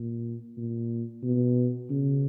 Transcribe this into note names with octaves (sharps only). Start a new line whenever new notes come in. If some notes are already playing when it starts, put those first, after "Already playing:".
Already playing: A#2
A#2
B2
C#3